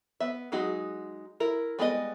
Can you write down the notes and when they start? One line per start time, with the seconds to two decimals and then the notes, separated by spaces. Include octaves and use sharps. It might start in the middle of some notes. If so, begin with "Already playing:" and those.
0.20 B3 E5
0.52 F#3 G#3 D#4 F#4 G#4
1.40 E4 A#4
1.79 G3 G#3 B3 A#4 D#5